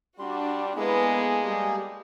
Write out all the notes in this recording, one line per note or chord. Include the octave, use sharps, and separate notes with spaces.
G3 D4 F#4 C6
G#3 A#3 B3 E4 G#4 A4 B4
G3